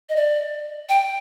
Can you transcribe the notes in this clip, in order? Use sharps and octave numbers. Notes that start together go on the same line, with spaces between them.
D#5
D5
G5